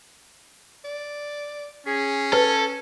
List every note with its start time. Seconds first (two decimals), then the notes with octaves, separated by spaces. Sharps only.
0.84 D5
1.87 C#4 G#4
2.33 A4 B4